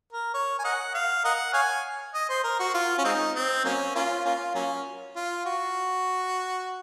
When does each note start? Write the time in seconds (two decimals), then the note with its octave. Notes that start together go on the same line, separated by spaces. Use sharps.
0.13 A#4
0.34 C#5
0.59 G#5
0.64 A#4 D#5 F#5
0.94 F5
1.24 A#4 D#5 F#5
1.54 C#5 F5 G#5
2.14 D#5
2.30 C5
2.44 A#4
2.60 F#4
2.74 F4
2.98 C#4
3.05 G#3 C4 D#4
3.35 C4
3.65 F#3 A#3 C#4
3.95 A#3 C#4 F4
4.25 A#3 C#4 F4
4.55 F#3 A#3 C#4
5.16 F4
5.46 F#4